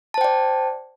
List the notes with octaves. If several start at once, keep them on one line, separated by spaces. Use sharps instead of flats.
C5 D5 G5 A5